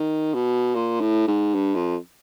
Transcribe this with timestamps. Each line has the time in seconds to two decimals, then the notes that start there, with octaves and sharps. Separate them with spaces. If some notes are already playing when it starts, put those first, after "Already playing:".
Already playing: D#3
0.34 B2
0.75 A#2
1.01 A2
1.28 G#2
1.54 G2
1.75 F2